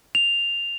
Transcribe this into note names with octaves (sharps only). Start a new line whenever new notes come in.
F7